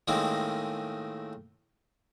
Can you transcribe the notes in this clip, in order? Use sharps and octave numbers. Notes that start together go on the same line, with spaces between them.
A2 D#3 G#3 A#3 C4